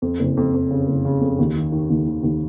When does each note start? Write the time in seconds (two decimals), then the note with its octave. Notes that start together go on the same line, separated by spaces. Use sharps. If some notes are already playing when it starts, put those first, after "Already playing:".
0.02 F2
0.19 F#1
0.37 F2
0.54 F2
0.71 C#3
0.88 F#1
1.05 C#3
1.21 F2
1.39 D#2
1.55 D#3
1.72 D#3
1.90 D#2
2.07 D#3
2.23 D#2